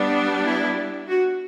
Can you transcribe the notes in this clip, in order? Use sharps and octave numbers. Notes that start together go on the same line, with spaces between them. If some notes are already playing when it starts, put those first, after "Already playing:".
Already playing: G3 B3 D4
E4
F#4